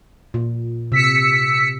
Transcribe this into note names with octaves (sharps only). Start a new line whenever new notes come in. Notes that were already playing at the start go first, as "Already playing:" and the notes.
A#2
C3 E6 B6 C#7